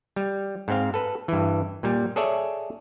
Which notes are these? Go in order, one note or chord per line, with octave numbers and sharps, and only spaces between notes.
G3
G#2 C4 F5
A4 B4
G2 E3
A#2 G3
G#4 A4 C#5 D5 E5